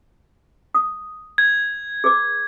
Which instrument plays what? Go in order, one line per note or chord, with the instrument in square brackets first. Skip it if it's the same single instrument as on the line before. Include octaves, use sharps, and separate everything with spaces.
[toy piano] D#6
[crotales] G#6
[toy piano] G#4 B4 D6